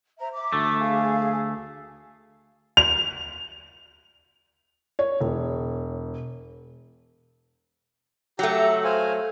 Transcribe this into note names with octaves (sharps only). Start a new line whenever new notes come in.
C5 E5 A#5
E5 D6
D2 A3
G#4 F5 G#5
F7
C#5
E1
F#3 A3 G4 A#5
C5 F5 G#5